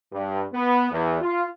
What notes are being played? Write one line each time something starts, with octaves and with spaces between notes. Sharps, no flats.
G2
B3
E2
F4